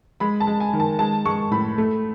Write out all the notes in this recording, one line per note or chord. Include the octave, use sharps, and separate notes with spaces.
G#3 B5
A5
G#3
G#5
D#3
A5
G#3 A5
G#3 C#6
A2 B5
A3